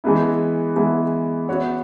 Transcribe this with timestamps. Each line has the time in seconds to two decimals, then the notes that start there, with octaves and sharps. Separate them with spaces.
0.04 E3 G#3 B3 E4
0.76 E3 G#3 B3 E4
1.48 B3 F#4 C#5 E5